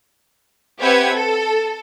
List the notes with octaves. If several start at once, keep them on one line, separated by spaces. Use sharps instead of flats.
C4 G4 B4 E5 F#5 G#6
A4